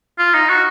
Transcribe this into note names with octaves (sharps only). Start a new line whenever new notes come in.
F4
D#4
F#4